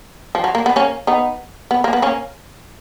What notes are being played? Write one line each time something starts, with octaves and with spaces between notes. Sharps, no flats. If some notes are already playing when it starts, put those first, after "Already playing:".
F3
F#3
A#3
B3
A#3 C#4
B3 D#4
B3
A#3
B3
A#3 C#4